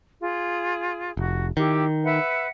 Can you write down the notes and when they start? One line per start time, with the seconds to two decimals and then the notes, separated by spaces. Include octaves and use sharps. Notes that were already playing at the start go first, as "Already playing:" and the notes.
0.20 F4 G#4
1.17 F1 F#4
1.57 D#3 E4 G4
2.03 B4 E5 F#5